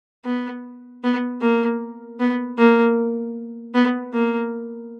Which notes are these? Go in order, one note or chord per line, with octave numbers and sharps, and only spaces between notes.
B3
B3
A#3
B3
A#3
B3
A#3